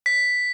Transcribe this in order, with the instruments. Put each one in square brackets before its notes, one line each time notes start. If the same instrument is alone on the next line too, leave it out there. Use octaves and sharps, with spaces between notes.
[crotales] B6